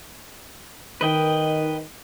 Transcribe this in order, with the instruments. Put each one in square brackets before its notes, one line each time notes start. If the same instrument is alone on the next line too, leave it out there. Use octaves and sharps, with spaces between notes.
[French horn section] D#3 [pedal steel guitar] B4 D#5 G5